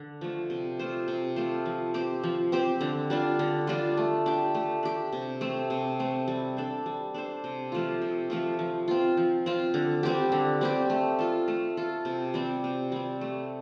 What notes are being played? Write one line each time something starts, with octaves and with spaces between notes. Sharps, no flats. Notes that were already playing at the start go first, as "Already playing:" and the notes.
Already playing: D3
F3 A3
C3
A3 F4 C5
C3
A3 F4 C5
F3
C4 G4 C5
F3
C4 G4 C5
D3
G3 D4 F4
D3
G3 D4 F4
A3
D4 G4
A3
D4 G4
C3
A3 C4
C3
A3 C4
G3
D4 A4 C5
G3
D4 A4 C5
C3
F3 A3 F4
C3
F3 A3 F4
F3
C4 F4
F3
C4 F4
D3
G3 C4 G4
D3
G3 C4 G4
A3
F4 A4
A3
F4 A4
C3
G3 C4
C3
G3 C4
A3